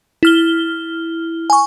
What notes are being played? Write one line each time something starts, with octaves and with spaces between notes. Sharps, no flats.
E4 F6 G7
G#5 C#6